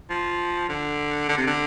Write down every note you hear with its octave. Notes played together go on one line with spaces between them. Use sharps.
F3
D3
D3
C3
D3